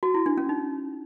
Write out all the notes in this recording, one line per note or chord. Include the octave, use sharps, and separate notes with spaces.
F#4
E4
D4
C#4
D#4